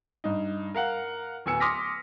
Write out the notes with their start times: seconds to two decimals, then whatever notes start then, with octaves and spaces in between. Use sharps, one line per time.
0.24 G2 D#4
0.74 A#4 F5 F#5
1.46 D1 B3 G#5 E6 C#7
1.60 C6 D6 D#6 F6 A#6 B6